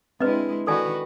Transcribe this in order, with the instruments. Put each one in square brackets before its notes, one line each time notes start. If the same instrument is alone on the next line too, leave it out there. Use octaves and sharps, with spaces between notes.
[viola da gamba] G#3 E4 [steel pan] C4 D4 [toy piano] B4 D#5
[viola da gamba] D#3 F#4 B4 [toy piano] A4 D5 G#5